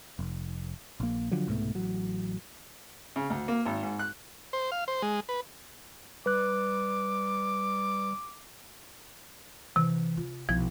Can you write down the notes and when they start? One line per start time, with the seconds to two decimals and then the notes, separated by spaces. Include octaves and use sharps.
0.19 F1
1.00 A#1 A#3
1.32 D3 F3 F#3
1.48 C2 G#2 B2 A3
1.75 A1 F#3
3.16 C#3
3.30 D2
3.48 A#3
3.66 G#1
3.83 G#2
3.99 F#6
4.53 C5
4.72 F5
4.88 C5
5.02 G#3
5.29 B4
6.26 G3 B4 D6 F#6
9.76 C3 E3
10.17 F4
10.49 B1 F3 E4